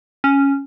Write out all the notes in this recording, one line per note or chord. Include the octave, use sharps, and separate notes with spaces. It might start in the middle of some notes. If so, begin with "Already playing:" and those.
C#4